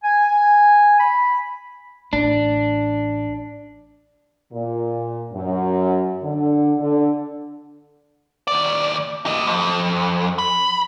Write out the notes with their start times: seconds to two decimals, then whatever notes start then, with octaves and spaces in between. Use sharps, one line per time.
0.04 G#5
1.00 B5
2.13 A1 D4
4.53 A#2
5.33 F#2
6.23 D3
6.79 D3
8.48 D#2 D5
9.26 G4 D#5
9.47 F2
10.39 B5